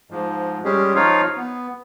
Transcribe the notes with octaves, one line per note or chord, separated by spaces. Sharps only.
G#2 F3
G3 G#3 C#4 G4 G#4
F3 D#4 F4 C#5 F5
B3